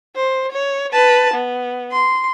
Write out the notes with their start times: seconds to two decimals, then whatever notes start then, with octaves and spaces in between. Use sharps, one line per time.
0.16 C5
0.52 C#5
0.93 B4 A5
1.34 B3
1.92 C6